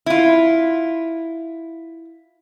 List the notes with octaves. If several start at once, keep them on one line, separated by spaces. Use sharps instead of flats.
E4 F4